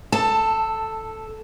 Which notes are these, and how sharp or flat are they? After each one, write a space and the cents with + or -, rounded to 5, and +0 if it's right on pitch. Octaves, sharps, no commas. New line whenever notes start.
A4 +0 A5 +15